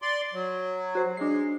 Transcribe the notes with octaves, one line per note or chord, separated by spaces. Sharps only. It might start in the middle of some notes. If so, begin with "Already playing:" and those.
D5 C6
F#3
F#4 C5
G#3 D4 C7